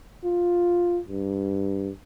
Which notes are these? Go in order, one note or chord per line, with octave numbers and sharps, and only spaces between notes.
F4
G2